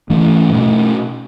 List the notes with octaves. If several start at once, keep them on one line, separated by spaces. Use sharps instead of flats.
G#2 E3 A3 C#4
B2 A3 C#4